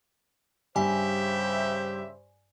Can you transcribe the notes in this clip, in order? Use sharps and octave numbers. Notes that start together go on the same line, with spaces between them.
G2 C#3 G4 C5 E5 G#5